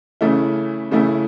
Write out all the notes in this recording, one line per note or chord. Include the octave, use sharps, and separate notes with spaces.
C#3 E3 A3 E4
C#3 E3 A3 E4